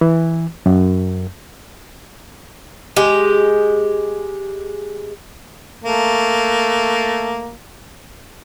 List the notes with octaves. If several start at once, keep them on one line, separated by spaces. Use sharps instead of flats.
E3
F#2
G#3 G4
A3 A#3